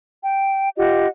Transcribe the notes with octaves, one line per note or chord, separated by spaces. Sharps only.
G5
F4 G4 D#5 F#5